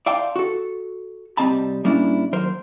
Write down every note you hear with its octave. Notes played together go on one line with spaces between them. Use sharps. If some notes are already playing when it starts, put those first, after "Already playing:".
D5 E5 F5 G5 A5 C6
F#4 A4
C2 G3 C4 D#5 A5 B5
A2 G3 A#3 C#4 D4 E4
D#2 F#3 A#4 C5